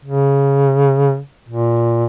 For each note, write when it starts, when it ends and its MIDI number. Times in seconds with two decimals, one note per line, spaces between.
0.05 1.18 49
1.49 2.05 46